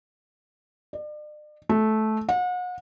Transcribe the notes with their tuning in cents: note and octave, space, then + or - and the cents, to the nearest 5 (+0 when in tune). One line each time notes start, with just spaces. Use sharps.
D5 +40
A3 -15
F#5 -40